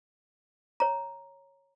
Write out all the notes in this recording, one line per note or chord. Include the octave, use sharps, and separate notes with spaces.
C#5 A#5